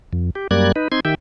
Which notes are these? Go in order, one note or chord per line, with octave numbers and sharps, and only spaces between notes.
F2
G4
F#2 G3 A#3 D5 F#6 G#6
D#4 B4
C4 D#4 C6 G#6
D#3 G4 E5 G5